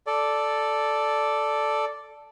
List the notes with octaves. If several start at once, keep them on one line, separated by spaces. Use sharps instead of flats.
A4 D5